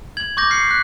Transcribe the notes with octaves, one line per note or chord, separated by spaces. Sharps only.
G#6 F#7
C#6 D6 G6 A#6
F6 C7 C#7
F#6 B6